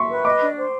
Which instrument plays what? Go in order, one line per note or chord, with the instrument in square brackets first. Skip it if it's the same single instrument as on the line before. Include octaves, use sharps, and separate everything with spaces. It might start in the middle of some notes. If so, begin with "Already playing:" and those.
Already playing: [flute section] E5 [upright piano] C6 C#6
[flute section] B4
[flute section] D#5 [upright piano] D6
[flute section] D4
C5